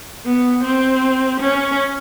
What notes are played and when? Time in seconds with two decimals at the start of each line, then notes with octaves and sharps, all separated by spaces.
0.25 B3
0.63 C4
1.40 C#4